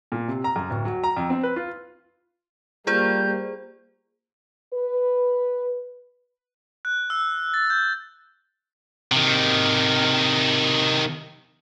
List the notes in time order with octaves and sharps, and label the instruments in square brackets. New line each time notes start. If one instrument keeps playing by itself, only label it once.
[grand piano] A#2
C3
A#5
F#2
D1
F#3
A#5
F2
C4
B4
F4
[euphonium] G3 [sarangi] A#3 [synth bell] F4 G#4 C5 [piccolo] G6
[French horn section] B4
[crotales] F#6
E6
A6
G6
[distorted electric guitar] C3 D#3